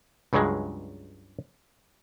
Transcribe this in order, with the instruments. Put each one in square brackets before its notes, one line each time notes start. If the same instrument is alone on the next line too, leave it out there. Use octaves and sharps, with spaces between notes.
[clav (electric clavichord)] C#2 G2 C#3 F#3 G#3